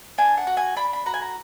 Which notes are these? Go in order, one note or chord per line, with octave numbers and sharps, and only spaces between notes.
D4 G#5
F#5
F#4
G#5
D4 B5
B5
F#4 A#5
G#5
A#5